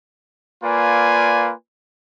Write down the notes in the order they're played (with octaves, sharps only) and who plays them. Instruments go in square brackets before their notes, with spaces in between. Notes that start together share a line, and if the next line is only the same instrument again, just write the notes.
[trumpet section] A#3 F4 B4 D5 G#5